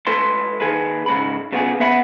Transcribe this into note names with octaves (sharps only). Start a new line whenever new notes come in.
G#3 E4 A4 B4 C6
D#3 G#4 B4
G#2 C#3 B5
C#3 B3 F4 G#4
B3 B4 E5 F#5 B5